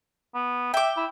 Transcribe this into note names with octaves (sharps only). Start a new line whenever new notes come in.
B3
E5 G5 D6
E4